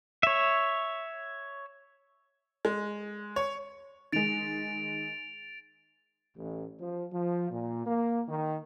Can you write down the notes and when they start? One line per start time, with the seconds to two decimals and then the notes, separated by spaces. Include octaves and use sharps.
0.23 C#5 E5
2.65 G#3
3.36 C#5
4.12 D#3 G#3 A6 D7 F7
6.37 A1
6.80 F3
7.12 F3
7.50 A#2
7.86 A#3
8.29 D#3